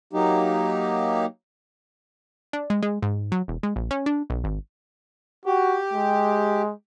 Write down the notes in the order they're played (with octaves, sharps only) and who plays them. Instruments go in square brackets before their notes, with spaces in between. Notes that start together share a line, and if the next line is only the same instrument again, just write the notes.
[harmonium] F#3 A#3 D#4 G4
[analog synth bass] D4
G#3
G#3
G#2
F#3
E1
G#3
A#1
C#4
D4
B1
G#1
[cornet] F#4 [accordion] G4
[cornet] G#3